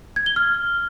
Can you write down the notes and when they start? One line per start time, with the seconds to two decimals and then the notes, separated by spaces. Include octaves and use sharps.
0.16 G#6
0.26 G7
0.36 F6